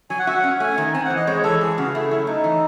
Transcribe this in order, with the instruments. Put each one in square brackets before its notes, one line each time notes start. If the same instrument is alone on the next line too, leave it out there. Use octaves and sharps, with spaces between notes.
[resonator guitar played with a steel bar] F#3 [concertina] G#5
[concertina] F#5
[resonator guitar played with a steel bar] F#4 [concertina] E5
[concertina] F#5
[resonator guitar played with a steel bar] C#4
[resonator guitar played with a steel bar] A3 [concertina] G#5
[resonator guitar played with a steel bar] D#3
[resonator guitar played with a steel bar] C4 [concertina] G#5
[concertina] F#5
[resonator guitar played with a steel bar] E3
[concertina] D#5
[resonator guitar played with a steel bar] G#3 [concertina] C#5
[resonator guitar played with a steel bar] E3 [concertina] A4
[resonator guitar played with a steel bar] F#3 [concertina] G#4
[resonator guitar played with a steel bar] C#3 [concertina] F#4
[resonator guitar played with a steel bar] A3 [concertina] E4
[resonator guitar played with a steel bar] F#3 [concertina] E4
[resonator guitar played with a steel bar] A3 [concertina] D#4
[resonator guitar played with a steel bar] E3